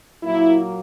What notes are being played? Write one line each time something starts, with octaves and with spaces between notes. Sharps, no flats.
A#2 F#3 A#3 E4